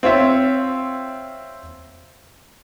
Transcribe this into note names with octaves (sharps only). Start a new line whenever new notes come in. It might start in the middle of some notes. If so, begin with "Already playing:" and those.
C4 F4 C#5 E5